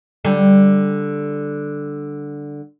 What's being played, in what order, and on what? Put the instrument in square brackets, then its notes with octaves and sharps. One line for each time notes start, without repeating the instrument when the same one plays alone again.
[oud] D3 G3